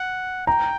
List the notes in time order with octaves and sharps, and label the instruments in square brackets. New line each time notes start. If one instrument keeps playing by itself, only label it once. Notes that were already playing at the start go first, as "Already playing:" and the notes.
Already playing: [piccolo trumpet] F#5
[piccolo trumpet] G5 [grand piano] A#5